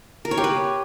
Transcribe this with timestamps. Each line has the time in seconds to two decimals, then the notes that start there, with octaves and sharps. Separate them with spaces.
0.25 A#4
0.31 C#5
0.38 G4
0.44 B4